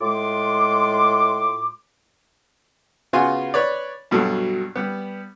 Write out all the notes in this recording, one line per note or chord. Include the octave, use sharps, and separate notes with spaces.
A2 G#3 F4 C6 D6
C#3 B3 F4 F#4 G#5 C6
B4 C#5 D5
G2 B2 F#3 A4
G3 B3